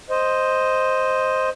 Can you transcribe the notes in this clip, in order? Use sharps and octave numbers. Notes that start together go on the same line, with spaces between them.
C5 D#5